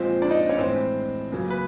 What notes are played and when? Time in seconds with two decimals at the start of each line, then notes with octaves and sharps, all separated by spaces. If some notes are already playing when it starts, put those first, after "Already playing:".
Already playing: A#2 F3 G#3 C4 C5
0.22 D4 D5
0.30 D#4 D#5
0.49 C#4 C#5
0.58 A2 E3 G#3 C4 C5
1.32 C#3 F#3 A#3
1.50 B4